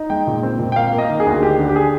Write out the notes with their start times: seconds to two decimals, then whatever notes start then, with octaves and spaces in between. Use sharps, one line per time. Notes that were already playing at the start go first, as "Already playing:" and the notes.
Already playing: D#4
0.10 G#3 G5
0.27 A#2
0.43 C4
0.59 A#2
0.72 G5
0.76 A#3 F5
0.93 A#3
0.98 D#5
1.09 D#3
1.20 G#4
1.26 D2
1.43 D3 G4
1.59 D3
1.69 G4
1.76 G#4